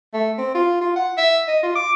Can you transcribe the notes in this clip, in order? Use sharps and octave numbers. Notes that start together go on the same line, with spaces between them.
A3
C4
F4
F4
F#5
E5
D#5
F4
D6